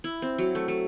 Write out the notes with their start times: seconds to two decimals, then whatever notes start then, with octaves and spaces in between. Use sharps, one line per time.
0.04 E4
0.22 C4
0.38 F#3
0.55 A3
0.68 A3